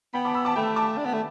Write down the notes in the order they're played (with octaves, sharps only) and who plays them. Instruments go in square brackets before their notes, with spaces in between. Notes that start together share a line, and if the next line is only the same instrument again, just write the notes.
[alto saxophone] B3 [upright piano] G5 B5
[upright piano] A5 D6
B5 E6
A5 D6
[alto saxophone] A3 [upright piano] G5 B5
[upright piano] A5 D6
[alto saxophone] D4
B3
A3